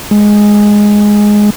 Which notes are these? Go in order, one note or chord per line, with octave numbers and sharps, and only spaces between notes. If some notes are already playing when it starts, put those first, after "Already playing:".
G#3